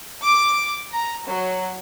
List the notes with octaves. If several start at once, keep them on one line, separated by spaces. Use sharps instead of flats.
D6
A#5
F#3